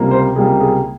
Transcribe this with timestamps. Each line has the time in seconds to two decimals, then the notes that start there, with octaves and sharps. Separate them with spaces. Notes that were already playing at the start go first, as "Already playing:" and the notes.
Already playing: C#2 C3 G3 A#3
0.11 C5
0.36 C#2 C3 G3 A#3 G#4
0.60 G#4